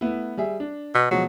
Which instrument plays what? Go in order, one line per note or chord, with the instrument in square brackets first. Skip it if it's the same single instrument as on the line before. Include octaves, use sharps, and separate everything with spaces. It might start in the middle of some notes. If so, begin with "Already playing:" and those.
[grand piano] A3 B3 E4
G3 G#4 E5
D4
[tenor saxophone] B2
[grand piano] B2 F3 G#3 [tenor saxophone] F#3